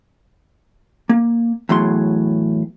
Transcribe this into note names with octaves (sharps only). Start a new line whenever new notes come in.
A#3
E2 A2 F#3 C6